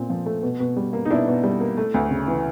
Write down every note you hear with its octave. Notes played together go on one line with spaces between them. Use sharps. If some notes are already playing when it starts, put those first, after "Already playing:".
Already playing: A#2 C4
F3
A3
B2
B2
G3
A#3
D#4
B2 D4 E4
B2
G3
A#3
A3
D2
C#3
E3